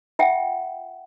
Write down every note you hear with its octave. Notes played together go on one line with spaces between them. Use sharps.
F4 E5 F#5 G5